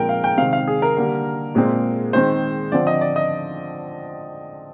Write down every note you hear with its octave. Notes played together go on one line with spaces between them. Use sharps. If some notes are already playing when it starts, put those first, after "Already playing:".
Already playing: A#2 F3 G#3 C4 A#4 G5
F5
G5
C3 D#3 G#3 C4 F5
F5
G#4
A#4
D3 G3 A#3
A#2 G#3 C4
D#3 G#3 C4 C5
D3 F3 C4 D5
D#5
D5
D#5